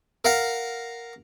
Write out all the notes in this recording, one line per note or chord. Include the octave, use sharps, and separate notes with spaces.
A#4 F5 F#5